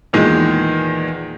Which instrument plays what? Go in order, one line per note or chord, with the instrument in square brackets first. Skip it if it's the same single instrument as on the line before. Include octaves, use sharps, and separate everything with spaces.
[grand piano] E2 A#2 D#3 G#3